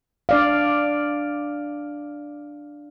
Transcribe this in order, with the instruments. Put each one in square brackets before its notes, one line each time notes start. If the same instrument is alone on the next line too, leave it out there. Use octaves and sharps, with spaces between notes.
[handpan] D4 D5 F5